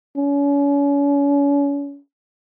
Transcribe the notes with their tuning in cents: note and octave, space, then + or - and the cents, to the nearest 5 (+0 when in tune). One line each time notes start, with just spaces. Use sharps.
C#4 +40